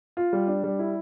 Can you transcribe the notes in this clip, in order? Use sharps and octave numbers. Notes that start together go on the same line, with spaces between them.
F4
G3
D4
G3
E4